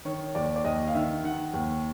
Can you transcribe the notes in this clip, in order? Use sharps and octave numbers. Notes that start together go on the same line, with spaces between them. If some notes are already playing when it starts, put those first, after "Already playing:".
D#3 C#5
D#2 D5
D5
D#2 D#5
F5
D#3 E5
D#3 F#5
D#2